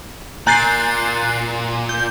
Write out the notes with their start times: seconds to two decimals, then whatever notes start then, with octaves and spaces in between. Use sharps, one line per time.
0.47 A#2 G#5 A#5 F#6 G6 A6 C7
1.89 G6